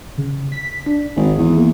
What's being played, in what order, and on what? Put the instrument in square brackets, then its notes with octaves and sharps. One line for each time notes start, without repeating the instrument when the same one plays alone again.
[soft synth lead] C#3
B6
D4
[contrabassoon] G#1 [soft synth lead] G#4
[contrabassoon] E2
[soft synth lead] A#3